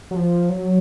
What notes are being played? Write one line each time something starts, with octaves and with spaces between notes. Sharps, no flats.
F#3
F3
F#3